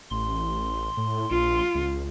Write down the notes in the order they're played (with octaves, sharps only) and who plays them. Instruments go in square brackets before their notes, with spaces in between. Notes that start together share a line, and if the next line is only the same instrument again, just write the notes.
[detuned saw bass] A1 [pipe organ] C6
[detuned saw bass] A2
[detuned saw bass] A#1 [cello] F4
[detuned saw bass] C#2